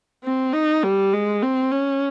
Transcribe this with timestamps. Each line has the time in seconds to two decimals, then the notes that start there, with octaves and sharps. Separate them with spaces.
0.24 C4
0.53 D#4
0.84 G3
1.13 G#3
1.43 C4
1.72 C#4